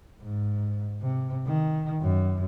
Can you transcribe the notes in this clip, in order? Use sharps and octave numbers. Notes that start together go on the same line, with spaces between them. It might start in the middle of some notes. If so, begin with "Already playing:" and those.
G#2
C3
D#3
F#2